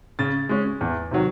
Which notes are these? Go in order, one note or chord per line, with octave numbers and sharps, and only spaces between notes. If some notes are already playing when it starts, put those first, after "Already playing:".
C#3 A6
G#3 C#4
E2
C3 D#3 F#3